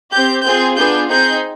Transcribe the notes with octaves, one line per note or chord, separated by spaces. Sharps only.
C4 G4 G6
C4 F4 G#4 G6
B3 D4 F4 G#4 G6
C4 D#4 G#4 G6